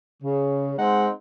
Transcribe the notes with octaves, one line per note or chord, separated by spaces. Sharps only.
C#3
G#3 C4 D#4 F#5